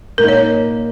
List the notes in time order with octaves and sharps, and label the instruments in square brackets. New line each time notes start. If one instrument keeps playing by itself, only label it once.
[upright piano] A#2 A#3 D#4 [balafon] A#4
[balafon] C#5